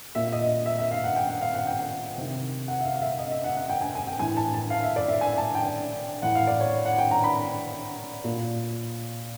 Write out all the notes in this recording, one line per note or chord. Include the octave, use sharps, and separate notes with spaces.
A#2 E5
D#5
E5
E5
F5
F#5
G5
F#5
F5
F#5
G5
C3 D#3
F#5
E5
F5
F5
E5
D#5
E5
F#5
F#5
G5
G#5
G#5
G5
A2 E3 G#5
A5
A5
F5
E5
D5
E5
G#5
A5
G5
A2 E3 F#5
F5
D5
C#5
F#5
G5
A#5
B5
A#2